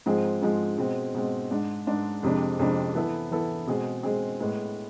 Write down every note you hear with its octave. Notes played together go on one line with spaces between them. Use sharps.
G#2 F3 G#3 C4 G#4
G#2 F3 G#3 C4 G#4
B2 G#3 C4
B2 G#3 C4
G#2 G#3 D4
G#2 G#3 D4
F2 C3 G#3 D4
F2 C3 G#3 D4
E3 B3 E4 A4
E3 B3 E4 A4
B2 G#3 C4 G#4
B2 G#3 C4 G#4
A2 G#3 B3